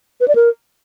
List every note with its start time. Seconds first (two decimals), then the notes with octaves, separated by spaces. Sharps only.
0.20 B4
0.28 D5
0.35 A#4